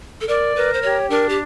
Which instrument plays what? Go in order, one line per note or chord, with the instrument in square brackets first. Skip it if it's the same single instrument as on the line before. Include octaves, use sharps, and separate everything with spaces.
[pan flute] A4
[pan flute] A#4 [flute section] D5
[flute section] A#4 [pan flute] B4
[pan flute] C5
[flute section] G4 [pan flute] C#5
[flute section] D4 [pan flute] A#4
[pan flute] G4